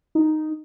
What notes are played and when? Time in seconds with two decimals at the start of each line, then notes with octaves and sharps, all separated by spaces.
0.15 D#4